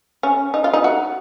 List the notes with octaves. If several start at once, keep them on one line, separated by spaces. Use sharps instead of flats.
C#4
D#4
F4
D#4
F#4